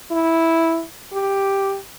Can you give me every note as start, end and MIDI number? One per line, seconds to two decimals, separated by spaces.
0.11 0.83 64
1.13 1.77 67